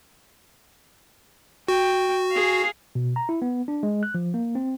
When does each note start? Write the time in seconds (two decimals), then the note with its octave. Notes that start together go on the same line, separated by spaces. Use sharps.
1.68 F#4 G5
2.31 G#4 F5
2.95 B2
3.16 A#5
3.29 E4
3.42 B3
3.68 D4
3.83 G#3
4.03 F#6
4.15 F3
4.34 A#3
4.55 C4